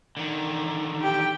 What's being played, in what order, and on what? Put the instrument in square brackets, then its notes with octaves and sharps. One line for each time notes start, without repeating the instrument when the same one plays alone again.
[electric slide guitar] D3 D#3
[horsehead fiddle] G4 G5